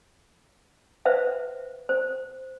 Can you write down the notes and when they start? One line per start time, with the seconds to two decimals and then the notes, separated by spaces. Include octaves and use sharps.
1.05 B4 C5 E5 F5
1.89 C5